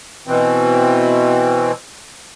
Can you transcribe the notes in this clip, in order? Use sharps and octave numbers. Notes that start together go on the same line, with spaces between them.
B2 E3 C4